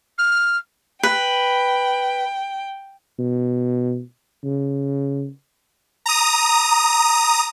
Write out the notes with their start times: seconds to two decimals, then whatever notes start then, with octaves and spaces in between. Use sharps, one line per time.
0.18 F6
1.03 B4 G5
3.19 B2
4.44 C#3
6.06 A#5 D#6